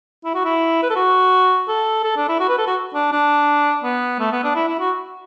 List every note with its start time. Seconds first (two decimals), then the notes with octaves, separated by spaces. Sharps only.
0.24 E4
0.34 F#4
0.45 E4
0.82 B4
0.90 A4
0.96 F#4
1.68 A4
2.04 A4
2.16 D4
2.29 E4
2.40 F#4
2.49 B4
2.58 A4
2.67 F#4
2.94 D4
3.12 D4
3.83 B3
4.19 A3
4.32 B3
4.44 D4
4.55 E4
4.68 E4
4.80 F#4